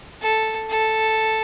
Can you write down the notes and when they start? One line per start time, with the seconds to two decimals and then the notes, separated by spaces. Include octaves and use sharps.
0.22 A4
0.69 A4